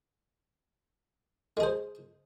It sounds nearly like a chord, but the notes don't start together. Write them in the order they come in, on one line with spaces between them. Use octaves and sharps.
G#3 G#4 C5